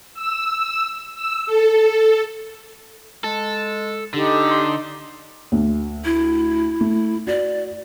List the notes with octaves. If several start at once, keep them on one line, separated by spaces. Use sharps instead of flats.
E6
E6
A4
G#3 A4
D3 D#4 G4 A4
C6
D2
E4
A3
F#4 D5